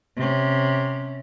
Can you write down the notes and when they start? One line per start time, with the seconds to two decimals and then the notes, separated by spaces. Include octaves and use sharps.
0.17 C3 C#4